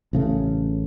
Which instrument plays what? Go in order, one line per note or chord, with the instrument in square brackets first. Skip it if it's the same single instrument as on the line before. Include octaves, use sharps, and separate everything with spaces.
[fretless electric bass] A1 C#3 F3 A3